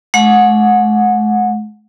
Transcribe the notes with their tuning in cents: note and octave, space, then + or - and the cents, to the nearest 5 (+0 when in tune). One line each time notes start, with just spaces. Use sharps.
G#3 +45 F#5 -20